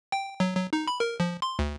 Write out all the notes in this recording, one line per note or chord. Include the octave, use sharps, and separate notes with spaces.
G5
F#3
F#3
D#4
B5
A#4
F3
C6
D2